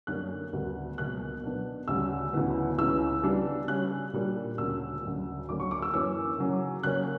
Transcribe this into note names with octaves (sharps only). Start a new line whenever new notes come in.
F#2 D3 G3 A#3 F#6
D2 C#3 G3 B3
C#2 B2 F#3 A#3 F#6
B2 F#3 B3 D4
D2 C#3 G3 E6
D2 C#3 E3 B3
C#2 C#3 E3 E6
C#3 G3 B3 D4
C#3 G3 C#4 F#6
A#2 G3 A#3 D4
D2 C#3 G3 A#3 D4 E6
D2 C#3 F#3
D2 D3 F#3 A#3 C#4 D6
C#6
D6
E6
F#2 E3 A#3 C#4 E6
C#3 F#3 C#4
C#3 F#3 A#3 C#4 F#6